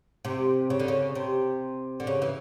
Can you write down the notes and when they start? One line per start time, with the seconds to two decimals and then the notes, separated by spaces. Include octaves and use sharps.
0.25 C3
0.70 C#3
0.80 D3
0.88 C#3
1.15 C3
2.00 D3
2.07 C#3
2.22 E3